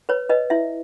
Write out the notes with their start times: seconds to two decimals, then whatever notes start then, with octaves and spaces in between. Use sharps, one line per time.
0.09 B4 C#5
0.29 B4 D#5
0.50 E4 E5